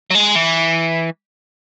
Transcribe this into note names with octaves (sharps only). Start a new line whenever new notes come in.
F#3
G#3
E3